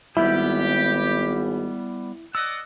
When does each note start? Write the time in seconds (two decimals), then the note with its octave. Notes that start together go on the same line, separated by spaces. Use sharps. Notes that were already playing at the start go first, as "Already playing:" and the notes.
0.17 G#1 G3 B3 E4 G4
2.35 D5 D#5 F#5 E6